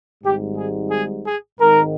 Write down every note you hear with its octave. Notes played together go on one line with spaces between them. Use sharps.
G#1 G#2 G3 G4
G#4
G#4
G#4
G#1 G#2 D#3 A#4